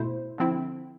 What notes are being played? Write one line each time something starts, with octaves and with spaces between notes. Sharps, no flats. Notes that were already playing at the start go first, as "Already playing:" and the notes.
Already playing: B2 A3 E4 C5
D3 F3 C4 E4